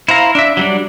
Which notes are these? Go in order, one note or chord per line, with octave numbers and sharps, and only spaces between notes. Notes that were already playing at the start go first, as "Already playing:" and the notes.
E4 C5 F5 A#5
D4 E5
F#3 G3 D4